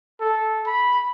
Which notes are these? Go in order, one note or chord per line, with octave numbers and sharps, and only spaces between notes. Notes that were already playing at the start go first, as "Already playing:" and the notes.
A4
B5